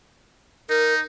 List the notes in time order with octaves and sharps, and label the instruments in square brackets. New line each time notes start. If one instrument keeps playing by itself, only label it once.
[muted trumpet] D#4 [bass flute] A#4